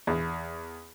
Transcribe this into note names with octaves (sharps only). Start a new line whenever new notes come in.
E2